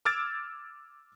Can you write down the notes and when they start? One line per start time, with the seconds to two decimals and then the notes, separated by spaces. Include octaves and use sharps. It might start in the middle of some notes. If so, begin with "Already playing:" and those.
0.05 D6 E6 F6 G#6 A6 D7